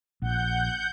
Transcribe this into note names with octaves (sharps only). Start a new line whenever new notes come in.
A#1 F#5 G6